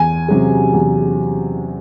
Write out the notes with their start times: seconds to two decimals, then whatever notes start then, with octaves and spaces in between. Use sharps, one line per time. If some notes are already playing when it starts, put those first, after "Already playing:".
Already playing: E2 G#5
0.28 C3 F#3 C#4 G#4
0.74 E2